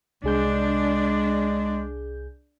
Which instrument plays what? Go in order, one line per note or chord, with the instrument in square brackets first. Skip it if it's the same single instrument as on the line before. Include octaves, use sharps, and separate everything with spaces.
[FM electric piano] C2 G#4 G6 [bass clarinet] G#3 [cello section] D4